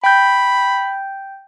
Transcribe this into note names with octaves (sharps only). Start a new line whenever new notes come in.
G5 B5 G6